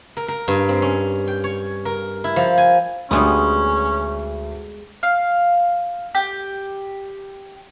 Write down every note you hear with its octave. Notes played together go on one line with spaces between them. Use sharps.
A#4
A#4
G2
C4
C#4
G5
C#5
A#4
E4
F3
G#5
D2 G3 G#3 B3 C#4
F5
G4